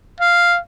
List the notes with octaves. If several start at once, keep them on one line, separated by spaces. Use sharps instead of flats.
F5